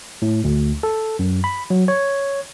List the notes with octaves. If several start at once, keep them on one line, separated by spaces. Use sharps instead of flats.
A2
D2
A4
F#2
B5
F#3
C#5